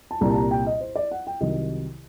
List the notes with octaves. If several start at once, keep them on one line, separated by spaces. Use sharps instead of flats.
A5
C2 A#2 G3 A#5
A5
A#5
G5
D#5
C5
D5
F#5
G5
C2 C3 D#3 F#3 D#5